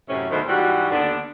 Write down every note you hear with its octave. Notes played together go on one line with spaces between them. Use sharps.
F#2 A2 C3 C#4
D2 B2 D#3 A3 C5
G#2 E3 G3 F#4
D#2 D3 B3 D4